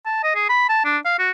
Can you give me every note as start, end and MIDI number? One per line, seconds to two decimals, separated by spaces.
0.06 0.21 81
0.23 0.34 75
0.35 0.48 68
0.49 0.66 83
0.69 0.81 81
0.85 0.98 62
1.05 1.16 77
1.19 1.31 66